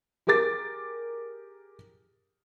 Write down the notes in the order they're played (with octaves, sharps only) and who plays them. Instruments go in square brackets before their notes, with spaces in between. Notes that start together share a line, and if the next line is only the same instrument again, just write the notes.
[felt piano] G4 G#4 A#4 D6 A6